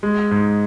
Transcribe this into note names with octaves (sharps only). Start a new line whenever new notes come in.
G#3
G#2